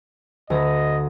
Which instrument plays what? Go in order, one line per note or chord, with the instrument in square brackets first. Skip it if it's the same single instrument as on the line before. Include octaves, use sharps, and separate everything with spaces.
[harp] D2 A#5 B5 [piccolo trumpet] D#5